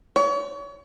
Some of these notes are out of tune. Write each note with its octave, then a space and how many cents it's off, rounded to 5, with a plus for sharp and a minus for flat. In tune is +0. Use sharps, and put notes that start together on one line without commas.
C#5 +35